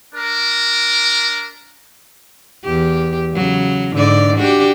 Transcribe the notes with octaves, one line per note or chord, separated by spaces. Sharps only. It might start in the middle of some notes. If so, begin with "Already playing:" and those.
D4 A#4
E2 G4
C#3 F#3
G#2 D3 D5
D4 F#4 G4